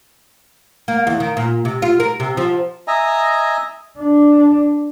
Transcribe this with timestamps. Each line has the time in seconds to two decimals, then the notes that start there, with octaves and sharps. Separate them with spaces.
0.88 A#3
1.07 E2
1.20 D#3
1.37 A#2
1.65 C3
1.82 F4
2.00 A#4
2.20 C3
2.37 F3
2.88 D#5 E5 G#5 A#5
3.99 D4